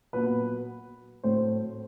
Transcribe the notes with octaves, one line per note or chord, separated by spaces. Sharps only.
A#2 F#3 B3 B4
A2 F#3 A3 C4 C5